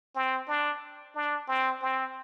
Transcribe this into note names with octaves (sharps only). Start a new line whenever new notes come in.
C4
D4
D4
C4
C4